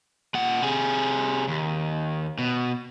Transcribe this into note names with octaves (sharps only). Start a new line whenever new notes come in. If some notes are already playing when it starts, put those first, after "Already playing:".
A#2 F#5
C3 G#4
D#2
B2